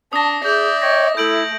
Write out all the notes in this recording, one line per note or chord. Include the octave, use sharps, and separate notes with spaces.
D4 A5 D#6 A#6
G#4 D5 E5 G6
C#5 D#5 G5 A#6
A3 E4 A4 G6 D7 F#7